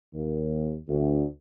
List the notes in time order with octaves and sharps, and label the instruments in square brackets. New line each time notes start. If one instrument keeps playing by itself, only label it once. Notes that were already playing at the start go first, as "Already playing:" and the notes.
[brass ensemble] D#2
D2